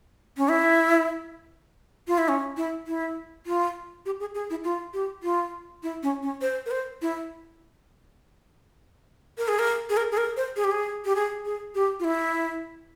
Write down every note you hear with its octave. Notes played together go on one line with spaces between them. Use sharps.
C#4
E4
F4
E4
C#4
E4
E4
F4
G4
G#4
G#4
E4
F4
G4
F4
E4
C#4
C#4
C5
A#4
C5
E4
A#4
G#4
A#4
G#4
A#4
G#4
A#4
C5
G#4
G4
G#4
G4
G#4
G#4
G4
F4
E4